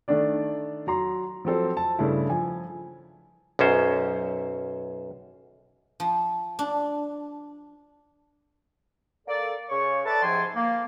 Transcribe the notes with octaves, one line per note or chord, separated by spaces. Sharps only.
D#3 A3 D4 D5
F#3 A#5 C6
F3 F#3 C4 A4 C5
A5
G2 C#3 A3 E4
F3 G#5
B1 F#2 C#4 C5
F3
D4
A#3 A4 D5
C#3 C#5 C#6
A4 B4 D5 E5 A5
G#2 C3 F3 G5 G#5 C6
A#3